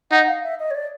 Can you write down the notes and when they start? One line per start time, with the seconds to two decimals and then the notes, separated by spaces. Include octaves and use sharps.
0.11 D#4 F#5
0.27 F5
0.43 E5
0.59 D#5
0.70 C#5
0.74 D5